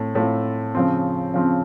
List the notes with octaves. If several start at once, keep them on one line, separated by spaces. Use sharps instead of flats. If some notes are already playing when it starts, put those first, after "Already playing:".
Already playing: A2 A3 C4
A2 A3 C4 F4
C#3 F3 C4
C#3 F3 C4